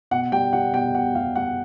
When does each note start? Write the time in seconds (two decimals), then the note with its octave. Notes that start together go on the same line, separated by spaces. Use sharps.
0.11 B2 F#5
0.32 G3 G5
0.53 G3 F#5
0.74 B2 G5
0.94 B2 F#5
1.15 G3 F5
1.36 G3 F#5